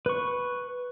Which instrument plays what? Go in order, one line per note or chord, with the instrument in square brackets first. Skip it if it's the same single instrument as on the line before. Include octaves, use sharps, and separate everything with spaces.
[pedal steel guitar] B4 C#6